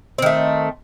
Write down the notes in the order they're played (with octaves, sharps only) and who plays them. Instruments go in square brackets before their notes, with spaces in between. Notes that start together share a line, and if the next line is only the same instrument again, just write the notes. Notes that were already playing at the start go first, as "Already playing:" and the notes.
[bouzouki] C4
D#3
A3